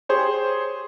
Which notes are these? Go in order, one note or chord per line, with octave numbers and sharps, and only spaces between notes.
G4 G#4 C5 C#5